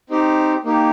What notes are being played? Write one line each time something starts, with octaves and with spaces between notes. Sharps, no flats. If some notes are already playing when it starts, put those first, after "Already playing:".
C4 D#4 G4
A#3 D#4 G4